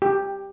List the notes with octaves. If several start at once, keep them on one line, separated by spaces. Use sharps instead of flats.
G4